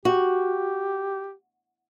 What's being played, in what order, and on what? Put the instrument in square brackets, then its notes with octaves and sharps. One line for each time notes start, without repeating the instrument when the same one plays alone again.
[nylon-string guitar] F#4 [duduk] G4